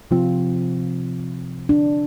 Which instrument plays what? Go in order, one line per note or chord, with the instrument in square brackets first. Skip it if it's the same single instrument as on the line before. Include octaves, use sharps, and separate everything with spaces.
[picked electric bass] C3 F3 C4 [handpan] F4
[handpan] D4